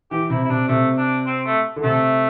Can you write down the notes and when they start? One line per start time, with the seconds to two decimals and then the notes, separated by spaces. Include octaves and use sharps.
0.11 E3 G4
0.30 C3 E4
0.44 E4
0.49 C3 D4
0.68 C3 A3
0.98 D4
1.26 C4
1.46 A3
1.76 D3
1.83 C3 A3